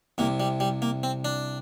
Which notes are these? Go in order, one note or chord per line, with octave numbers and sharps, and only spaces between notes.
C2 C3 A#3
G3
G3
A#3
C4
D4